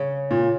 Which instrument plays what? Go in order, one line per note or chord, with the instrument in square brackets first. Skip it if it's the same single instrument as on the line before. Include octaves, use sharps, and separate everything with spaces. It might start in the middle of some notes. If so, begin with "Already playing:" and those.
Already playing: [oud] C#3
[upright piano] A#2